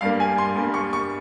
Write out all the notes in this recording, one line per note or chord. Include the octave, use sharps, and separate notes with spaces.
G2 G3 A#3 F5
G#5
C6
G2 G3 A#3
C#6
C#6